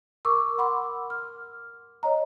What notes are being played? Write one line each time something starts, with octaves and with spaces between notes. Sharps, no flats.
A#4 C#6 D6 E6
F#5 B5 C6 D6 E6
F6
C#5 D#5 A#5